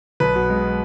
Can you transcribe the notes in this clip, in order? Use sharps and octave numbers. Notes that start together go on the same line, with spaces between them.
B1 B4
B2
G#3